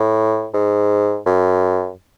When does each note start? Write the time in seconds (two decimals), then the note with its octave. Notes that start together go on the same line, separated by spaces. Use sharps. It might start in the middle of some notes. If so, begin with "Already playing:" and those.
Already playing: A2
0.54 G#2
1.26 F#2